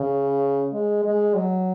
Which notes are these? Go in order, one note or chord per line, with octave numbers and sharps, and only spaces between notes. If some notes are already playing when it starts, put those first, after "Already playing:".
Already playing: C#3
G#3
G#3
F#3